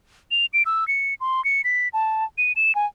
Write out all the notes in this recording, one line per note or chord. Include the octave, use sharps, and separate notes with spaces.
F7
D7
E6
C#7
C6
C#7
B6
A5
D#7
E7
G#5